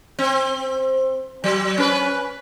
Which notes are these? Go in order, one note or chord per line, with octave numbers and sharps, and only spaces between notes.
C4
F#3
C#4 B4